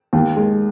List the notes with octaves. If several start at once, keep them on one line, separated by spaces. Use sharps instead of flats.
D#2
G#3